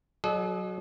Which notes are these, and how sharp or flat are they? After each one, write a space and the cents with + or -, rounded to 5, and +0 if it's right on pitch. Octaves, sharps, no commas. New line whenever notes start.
F#3 +0 A4 -45 D#5 -35